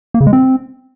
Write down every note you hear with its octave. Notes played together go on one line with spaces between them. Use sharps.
A#3
C#3
G#3
C4